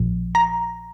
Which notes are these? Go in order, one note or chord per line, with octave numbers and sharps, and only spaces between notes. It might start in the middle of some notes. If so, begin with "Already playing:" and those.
Already playing: A#1 A#2 F3
A#5